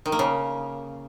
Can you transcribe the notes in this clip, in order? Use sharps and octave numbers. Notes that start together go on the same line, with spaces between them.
D#3
A#3
C#3